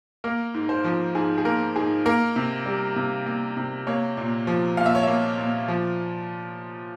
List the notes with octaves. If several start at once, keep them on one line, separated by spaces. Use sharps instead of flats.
A#3 A#4
G#2
C5
F3
G#2 G#4
G#4
A#3 A#4
G#2 G#4
A#3 A#4
C3
G3
C3
A#3
C3
A#3 C#5
A#2
F3
A#2 F5
E5
C#5
A#3 E5
A#2
F3